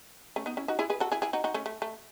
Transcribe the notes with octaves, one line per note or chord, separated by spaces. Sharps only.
A3 C#4
B3 D#4
C#4 E4
D#4 F#4
E4 G#4
G#4 B4
F#4 A4
E4 G#4
E4 G#4
D#4 F#4
D#4 F#4
A3 C#4
A3
A3